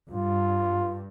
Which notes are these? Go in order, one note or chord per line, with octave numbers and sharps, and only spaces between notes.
G2 F4